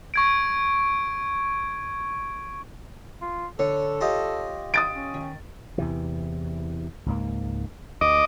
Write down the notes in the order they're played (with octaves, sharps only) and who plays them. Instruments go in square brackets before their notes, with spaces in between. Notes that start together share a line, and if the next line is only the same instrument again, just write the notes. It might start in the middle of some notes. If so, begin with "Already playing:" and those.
[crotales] C#6 G#6 D7
[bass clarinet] F4
[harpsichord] D3 [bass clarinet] A4 [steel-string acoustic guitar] C#5
[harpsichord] F4 G4 D#5
[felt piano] D#6 A6 D7
[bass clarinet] C#4
[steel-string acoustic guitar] D#3
[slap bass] E2 C3 E3
C#2 G#2 A#3
[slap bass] D2 [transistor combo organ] D#5 D6